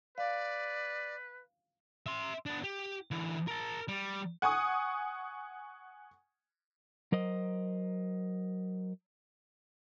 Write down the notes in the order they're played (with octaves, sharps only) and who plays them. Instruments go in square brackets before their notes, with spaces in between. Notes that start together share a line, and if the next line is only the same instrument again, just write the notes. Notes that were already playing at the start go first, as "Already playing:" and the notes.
[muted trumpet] B4 [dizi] D5 [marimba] F5
[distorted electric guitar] E5 C6
B3 D4
G4
D3 E3
A#4 A5
G3
[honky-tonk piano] F#5 G#5 C#6 D#6
[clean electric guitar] F#3 A#4 C5 D#5